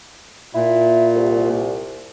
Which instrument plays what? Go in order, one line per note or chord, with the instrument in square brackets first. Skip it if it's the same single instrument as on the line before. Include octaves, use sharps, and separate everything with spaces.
[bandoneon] A#2 [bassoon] E4
[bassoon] C2